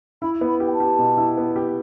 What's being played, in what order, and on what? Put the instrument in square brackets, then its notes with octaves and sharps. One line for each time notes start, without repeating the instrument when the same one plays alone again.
[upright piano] E4 [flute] B5
[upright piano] B3
[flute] B5
[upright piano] G4
[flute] G5
A5
[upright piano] G4
B2
E4
B3
G4